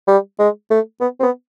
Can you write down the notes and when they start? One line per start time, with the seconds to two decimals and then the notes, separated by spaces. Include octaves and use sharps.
0.08 G3
0.39 G#3
0.70 A3
1.01 B3
1.20 C4
1.23 B3